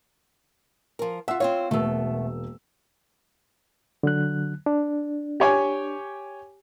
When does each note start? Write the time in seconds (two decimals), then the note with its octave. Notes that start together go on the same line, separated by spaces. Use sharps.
0.99 F3 A#4
1.28 F4 E5 F#5 E6
1.40 C4 F4 C#5 F5
1.71 E1 B2 A3 A#3 E6
4.03 D3 F#3 F#6
4.66 D4
5.40 G4 C#5 G#5